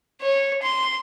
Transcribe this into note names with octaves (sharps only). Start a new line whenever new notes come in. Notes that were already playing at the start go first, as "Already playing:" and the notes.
C#5
C6